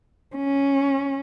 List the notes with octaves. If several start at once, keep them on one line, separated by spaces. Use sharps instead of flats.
C#4